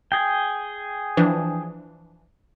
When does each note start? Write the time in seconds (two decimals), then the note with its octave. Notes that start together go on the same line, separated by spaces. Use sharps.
0.12 G#4 G5
1.17 E3 F3 D4